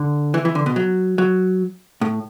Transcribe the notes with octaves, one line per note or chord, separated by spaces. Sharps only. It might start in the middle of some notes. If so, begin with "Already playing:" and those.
Already playing: D3
E3
E3
D3
B2
F#3
F#3
A2